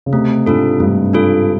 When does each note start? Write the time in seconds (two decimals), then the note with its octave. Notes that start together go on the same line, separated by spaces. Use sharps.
0.06 C#3
0.13 C3 A3
0.46 G#2 D4 F4 A4
0.80 G2 A3
1.13 D4 F4 A4